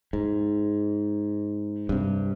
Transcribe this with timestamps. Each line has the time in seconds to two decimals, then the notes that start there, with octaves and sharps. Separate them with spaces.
0.13 G#2
1.89 G2 C3